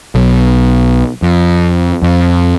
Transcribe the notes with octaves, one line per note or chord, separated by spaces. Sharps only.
B1
F2
F2